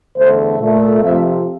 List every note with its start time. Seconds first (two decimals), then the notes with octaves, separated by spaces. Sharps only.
0.17 E2 D3 A3 C5
0.59 A#2 A3
1.02 F2 C3 F3 E5